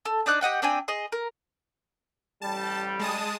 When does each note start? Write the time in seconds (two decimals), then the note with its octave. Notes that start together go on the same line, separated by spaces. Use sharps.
0.05 A4
0.26 D4 D#4 D5 F#6
0.41 G4 D#5 F#5 G5
0.62 C4 D4 G5 G#5
0.88 G#4 D#5 C6
1.12 A#4
2.42 A1 G3 A5
2.99 G#3 A5 D#6